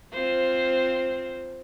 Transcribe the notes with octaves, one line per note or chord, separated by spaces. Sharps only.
C4 F4 C5